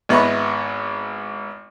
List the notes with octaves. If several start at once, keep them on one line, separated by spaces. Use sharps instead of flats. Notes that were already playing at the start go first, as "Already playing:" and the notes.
G#1 B3 E4 D#5 B5 C#6